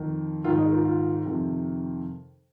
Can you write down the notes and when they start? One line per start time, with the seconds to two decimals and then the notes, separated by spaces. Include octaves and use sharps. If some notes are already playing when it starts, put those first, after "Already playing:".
Already playing: F2 D#3
0.44 G#2 D#3 F4
0.58 D#4 G#4
0.71 F4 A#4
0.85 F4
1.25 F2 C3 D#3